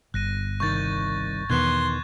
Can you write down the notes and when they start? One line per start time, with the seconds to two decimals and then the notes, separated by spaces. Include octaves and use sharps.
0.14 G1 F#6 A#6 D#7
0.60 C2 D#3 C#6 G6 A6
1.50 E2 B2 D#3 B3 C6 D6 F#6 G#6